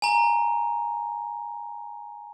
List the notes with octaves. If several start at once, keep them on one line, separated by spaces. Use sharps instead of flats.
G#5 A#5